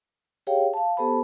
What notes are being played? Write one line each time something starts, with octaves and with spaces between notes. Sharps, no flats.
G4 G#4 C#5 F5 G5
F5 A5
B3 G4 A4 C5 A5 B5